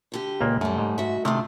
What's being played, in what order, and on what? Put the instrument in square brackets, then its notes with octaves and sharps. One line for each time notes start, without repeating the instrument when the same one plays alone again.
[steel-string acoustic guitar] D2 D3 G4
[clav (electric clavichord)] C#2 A#2 A#3
[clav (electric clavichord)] F#2 [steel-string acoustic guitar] G3 A3
[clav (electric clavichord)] G#2
[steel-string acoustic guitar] F#4 E5
[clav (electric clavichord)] C3 D#3 [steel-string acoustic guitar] A3 D4 F4